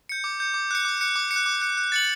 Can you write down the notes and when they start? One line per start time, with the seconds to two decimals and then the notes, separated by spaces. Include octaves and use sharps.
0.09 G6 C#7
0.24 D6
0.40 G6 C#7
0.54 D6
0.71 F#6 C#7
0.85 D6
1.01 F#6 C#7
1.16 D6
1.31 C#7
1.36 F#6
1.46 D6
1.61 F#6 C#7
1.77 F#6
1.92 A6 C#7 F#7